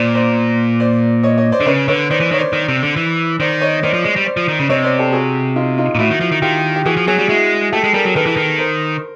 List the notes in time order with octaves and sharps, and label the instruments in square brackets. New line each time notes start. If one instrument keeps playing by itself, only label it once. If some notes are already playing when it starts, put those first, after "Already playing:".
Already playing: [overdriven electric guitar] A#2 [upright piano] C5 D5
[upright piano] C5 D5
C5 D5
C#5 D#5
C#5 D#5
C5 D5
[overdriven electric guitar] D3
[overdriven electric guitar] C#3 [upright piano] B4 C#5
[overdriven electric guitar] D3 [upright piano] B4 C#5
[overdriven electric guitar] D#3 [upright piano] C5 D5
[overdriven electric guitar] E3
[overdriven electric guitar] D#3 [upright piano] C#5
[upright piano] C5 D5
[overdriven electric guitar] D#3
C3
D3
E3
[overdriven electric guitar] D#3 [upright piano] C5 D5
[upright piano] C#5 D#5
[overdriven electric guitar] D#3 [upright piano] C5 D5
[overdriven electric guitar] F3
G#3
G3
[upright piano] C5 D5
[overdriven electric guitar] F3
D#3
C#3
[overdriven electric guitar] C3 [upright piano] C#5 D#5
[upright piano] C5 D5
G4 A4
F#4 G#4
D#4 F4
D#4 F4
[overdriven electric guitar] A#2
[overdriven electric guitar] A2 [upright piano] E4 F#4
[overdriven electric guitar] D#3
F3
D#3
[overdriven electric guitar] D#3 [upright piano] F4 G4
[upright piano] G4
[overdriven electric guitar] E3 [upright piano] F#4 G#4
[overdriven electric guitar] F3
[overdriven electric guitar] F#3 [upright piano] F#4 G#4
[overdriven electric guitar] G3
[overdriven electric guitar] G#3 [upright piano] E4 F#4
[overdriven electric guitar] A3 [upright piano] G4 A4
[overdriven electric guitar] G#3
[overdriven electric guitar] G3 [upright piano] G#4 A#4
[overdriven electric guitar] F#3
[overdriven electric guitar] D#3 [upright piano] A4 B4
[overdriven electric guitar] E3
D#3
[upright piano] A#4 C5